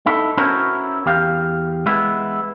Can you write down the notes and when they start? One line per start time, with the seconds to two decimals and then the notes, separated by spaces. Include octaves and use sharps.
0.06 D#4 E4 A4
0.37 C#4 E4 F#4 A#4 C5 C#5
1.06 E2 G4 F5
1.86 G#3 B3 E4